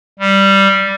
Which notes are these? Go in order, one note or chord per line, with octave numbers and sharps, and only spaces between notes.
G3